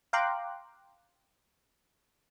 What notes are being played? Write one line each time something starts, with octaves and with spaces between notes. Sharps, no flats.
F5 G5 A#5 C6 D6 F#6